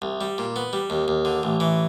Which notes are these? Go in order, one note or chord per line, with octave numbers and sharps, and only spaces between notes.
C2
G3
A#2
B3
G3
D#2
D#2
D3
A1
E3